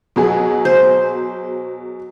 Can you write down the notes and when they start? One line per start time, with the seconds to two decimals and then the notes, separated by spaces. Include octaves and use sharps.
0.16 B2 F#3 G#4
0.65 C5